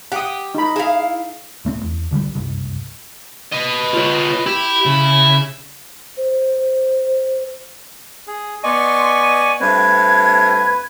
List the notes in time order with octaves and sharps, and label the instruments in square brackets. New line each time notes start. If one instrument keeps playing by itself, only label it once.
[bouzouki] G4 [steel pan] F#5 D#6
[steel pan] D#4 B5
[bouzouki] E4 F5 [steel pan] G#4
[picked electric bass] D1 A3 A#3 C4
E2
C2 D3 F#3 G3
F#1 C2 G2
[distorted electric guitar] B4 D#5
[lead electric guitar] F4 C#5
[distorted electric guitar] E4 [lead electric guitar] G4
[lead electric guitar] C#3
[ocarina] C5
[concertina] G#4
[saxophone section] B3 D#5 [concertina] D5 G#5 C#6 [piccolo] C6
[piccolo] D#7
[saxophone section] G2 A3 C4 [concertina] B4 [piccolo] G#6